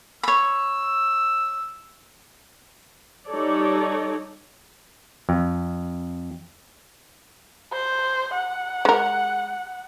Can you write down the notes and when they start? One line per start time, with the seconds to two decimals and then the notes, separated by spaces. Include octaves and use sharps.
0.23 C#5 B5 E6
3.27 G3 D#4 A4 C#5 D5
5.29 F2
7.72 C5
8.33 F#5
8.85 G#3 A#4